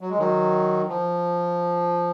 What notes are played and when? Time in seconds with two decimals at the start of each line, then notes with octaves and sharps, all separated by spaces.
0.01 F#3
0.10 G#3
0.19 D#3 F#3
0.88 F3